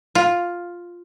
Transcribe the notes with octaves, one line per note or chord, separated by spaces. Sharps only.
F4